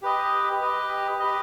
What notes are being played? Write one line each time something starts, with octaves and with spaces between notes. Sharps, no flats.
G4 B4 D#5
G4 B4 D#5
G4 B4 D#5